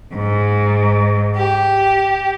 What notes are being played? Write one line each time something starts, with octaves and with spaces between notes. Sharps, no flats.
G#2
G4